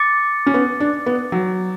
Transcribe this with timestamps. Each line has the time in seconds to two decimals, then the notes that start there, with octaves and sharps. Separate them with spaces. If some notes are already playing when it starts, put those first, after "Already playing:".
Already playing: D6 A6 C#7
0.47 C#4
0.54 B3
0.80 D4
1.06 B3
1.32 F#3